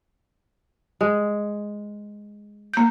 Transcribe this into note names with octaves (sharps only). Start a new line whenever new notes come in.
G#3
A#3 G6